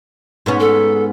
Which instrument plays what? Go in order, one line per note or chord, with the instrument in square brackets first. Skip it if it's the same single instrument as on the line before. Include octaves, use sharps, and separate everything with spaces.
[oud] G#2 B3 C#4
[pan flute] A4